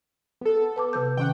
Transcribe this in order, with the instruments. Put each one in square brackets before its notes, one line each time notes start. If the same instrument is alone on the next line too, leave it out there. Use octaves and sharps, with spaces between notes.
[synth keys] B3 A4
[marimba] B4 A5 D6
C3 B4 G6
[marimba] D#3 C#4 [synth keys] F#5 G5